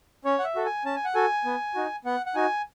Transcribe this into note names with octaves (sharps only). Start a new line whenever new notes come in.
C#4 C#5
F#5
E5
F#4 A4
G#5
C#4 A5
G#5
F#5
F#4 A4 G#5
B3
D#4 F#4
B3 F#5
F#5
D#4 F#4 G#5